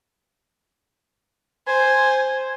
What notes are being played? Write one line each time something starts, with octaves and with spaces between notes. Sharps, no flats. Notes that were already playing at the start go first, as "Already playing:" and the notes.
C5 G#5